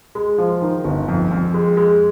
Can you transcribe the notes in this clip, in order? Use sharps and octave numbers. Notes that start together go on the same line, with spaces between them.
G#3
F3
D#3
G1
F2
F2
G#3
G#3